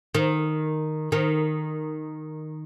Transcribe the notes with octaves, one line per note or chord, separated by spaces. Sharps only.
D#3
D#3